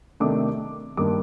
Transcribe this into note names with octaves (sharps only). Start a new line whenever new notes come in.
C3 D#3 A3 D4 D6
G2 D#3 A#3 D4 D6